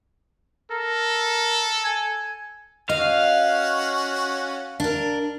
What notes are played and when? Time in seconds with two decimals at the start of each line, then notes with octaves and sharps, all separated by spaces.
0.71 A4 A#4
1.84 G#5
2.89 C#4 F#4 D#5 F5
4.80 D4 A#4